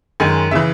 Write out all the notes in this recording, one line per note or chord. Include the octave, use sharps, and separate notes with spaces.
F#2 D#3 G#3 G#5
C#3 E3 E5